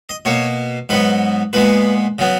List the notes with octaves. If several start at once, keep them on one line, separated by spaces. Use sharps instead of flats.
D#5
B2 A#3 C#5
G#2 F#3 B3 B4
A#2 G#3 B3 B4
C#3 F#3 B3